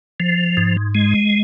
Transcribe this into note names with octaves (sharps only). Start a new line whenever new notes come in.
F3
G#2
G#3